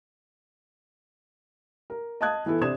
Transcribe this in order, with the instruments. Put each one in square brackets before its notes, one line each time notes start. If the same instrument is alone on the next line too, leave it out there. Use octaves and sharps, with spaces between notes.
[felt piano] A#4
D#5 F5 A5 D#6 F#6 G#6
E3 B3 E4 A4
C3 D4 C5 D#6 G#6 E7